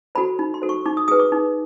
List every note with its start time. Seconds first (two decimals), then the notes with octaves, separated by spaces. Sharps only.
0.15 F#4 A4 C5 B5
0.39 D#4 B5
0.54 C6
0.62 F#4 A4 C5
0.69 C#6
0.86 D#4 D6
0.97 D#6
1.08 G#4 B4 D#6
1.20 D6
1.32 D#4